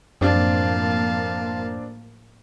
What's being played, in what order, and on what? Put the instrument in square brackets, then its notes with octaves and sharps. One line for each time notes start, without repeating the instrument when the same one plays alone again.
[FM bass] F#2 [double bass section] A2 F3 A#3 [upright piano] C4 D4 [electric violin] F5 A5